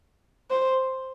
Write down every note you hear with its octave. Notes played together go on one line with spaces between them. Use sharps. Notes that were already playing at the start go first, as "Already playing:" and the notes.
C5